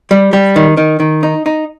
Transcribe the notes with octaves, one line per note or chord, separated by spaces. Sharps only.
G3
G3
D#3
D#3
D#3
D#4
D#4